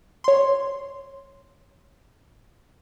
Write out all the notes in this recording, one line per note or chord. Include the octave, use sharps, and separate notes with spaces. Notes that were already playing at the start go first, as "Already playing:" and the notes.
C#5 C6